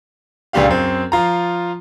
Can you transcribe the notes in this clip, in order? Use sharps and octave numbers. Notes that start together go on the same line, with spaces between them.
C#2 A#2 D4 G4 F5
F#2 C4
F3 F4 A#5